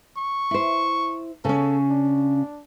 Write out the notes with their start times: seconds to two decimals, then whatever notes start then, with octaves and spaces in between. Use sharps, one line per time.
0.17 C#6
0.51 E4 C5
1.45 C#3 C#4 A4
1.90 D4